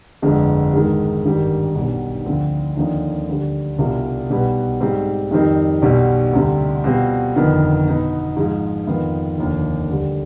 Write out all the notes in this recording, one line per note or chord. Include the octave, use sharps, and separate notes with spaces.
G1 F2 D3 G#3
G#2 D#3 G#3
G#1 G2 D#3 G3
B1 B2 G3 D4
D2 D3 F3 C4
D#2 D3 F3 C4 D#4
D2 D3 G3
C2 B2 G3 D4 F4
B1 B2 G3 B3
G#2 G3 C4
F2 D#3 G3 C4 D#4
B1 B2 G3
D2 C3 G3
B2 G3 C4 F4
G1 F2 D#3 B3
B2 B3 D#4
G#2 F3 G#3
F2 D#3 B3 F4
F1 D#2 D3 F3
D2 D3 G3